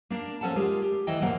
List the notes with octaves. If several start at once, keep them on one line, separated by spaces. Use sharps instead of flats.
A#3 D4
F3 C#4 A4 F#5 A5
G#3 F4 G4 A#4
G4
D2 E3 D#5 G5
F2 A#2 A#3 F#5 G5